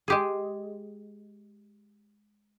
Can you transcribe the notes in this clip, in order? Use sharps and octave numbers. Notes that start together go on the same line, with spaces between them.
G#3 G4 G#4